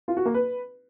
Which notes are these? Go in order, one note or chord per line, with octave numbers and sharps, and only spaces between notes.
F4
F#4
A#3
B4